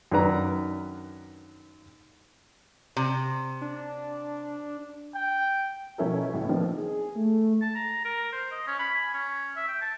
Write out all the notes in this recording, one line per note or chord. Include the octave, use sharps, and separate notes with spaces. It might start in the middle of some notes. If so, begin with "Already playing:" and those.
F#2 D#3 D4 B4 A#5
C3
D4
G5
B2 F3 C#4 E4 A4 A#4
C#2 A2 A3
D#3 F3 B3 C4 D4 D#4
G#4
A3
A5
A#5
A#4
C5
D#5
C#4
B5
G#5
C#4
E5
G5
A5